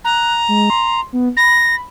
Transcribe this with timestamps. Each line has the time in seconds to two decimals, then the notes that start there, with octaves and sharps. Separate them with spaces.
0.05 A#5 F#6
0.48 G#3
0.70 C6
1.13 B3
1.37 B5 A#6